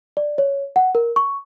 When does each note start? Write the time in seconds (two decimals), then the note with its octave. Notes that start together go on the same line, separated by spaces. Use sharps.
0.17 D5
0.38 C#5
0.76 F#5
0.95 A#4
1.16 C#6